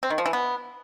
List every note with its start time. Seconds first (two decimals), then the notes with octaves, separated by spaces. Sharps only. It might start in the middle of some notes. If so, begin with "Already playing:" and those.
0.03 C4
0.10 D#3
0.18 F3
0.26 E3
0.33 B3